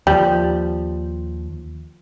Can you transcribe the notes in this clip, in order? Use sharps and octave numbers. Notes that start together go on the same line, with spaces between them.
D#2 F3 G3